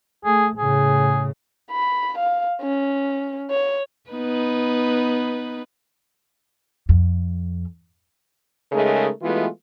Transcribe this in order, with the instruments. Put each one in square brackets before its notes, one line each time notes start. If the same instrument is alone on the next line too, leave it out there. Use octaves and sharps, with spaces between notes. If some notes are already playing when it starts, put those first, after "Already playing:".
[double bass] A3 [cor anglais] G#4
[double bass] A2 C#3 [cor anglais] G#4
[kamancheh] B5
F5
C#4
C#5
[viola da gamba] B3 D#4 B4
[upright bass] F2
[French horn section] C#3 G#3 A3 D#4 G#4 A#4
E3 G#3 A3 B3 F4 F#4